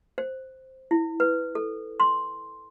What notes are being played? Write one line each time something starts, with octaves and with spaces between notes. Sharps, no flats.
C5
E4
B4
A4
C6